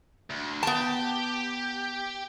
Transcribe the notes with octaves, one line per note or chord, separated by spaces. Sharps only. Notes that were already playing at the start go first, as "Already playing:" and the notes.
D2
B3 G4 A5